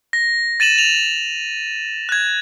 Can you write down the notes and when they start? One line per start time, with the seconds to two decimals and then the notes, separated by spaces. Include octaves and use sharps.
0.13 A#6
0.60 A6 D#7 E7 F#7
0.78 F7
2.09 F#6 G#6